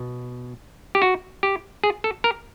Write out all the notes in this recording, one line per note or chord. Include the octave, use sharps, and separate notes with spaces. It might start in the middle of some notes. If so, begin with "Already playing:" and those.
Already playing: B2
G4
F#4
G4
G#4
A4
A#4